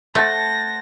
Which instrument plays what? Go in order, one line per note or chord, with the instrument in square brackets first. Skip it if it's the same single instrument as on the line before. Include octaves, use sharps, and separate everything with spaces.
[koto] A3 [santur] C5 F#5 A5 [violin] A#6